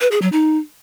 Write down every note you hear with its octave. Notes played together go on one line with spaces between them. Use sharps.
B4
G#4
F#3
D#4